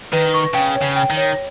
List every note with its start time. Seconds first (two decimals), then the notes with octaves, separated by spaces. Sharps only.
0.13 D#3 B4
0.34 C#6
0.54 C#3 G5
0.76 C#5
0.82 C#3
0.96 G5
1.10 D#3
1.17 C#5